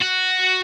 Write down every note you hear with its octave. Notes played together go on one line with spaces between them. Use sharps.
F#4